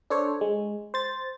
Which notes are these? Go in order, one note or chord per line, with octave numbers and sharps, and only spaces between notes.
D4 A4 C5 C#5
G#3
C5 A6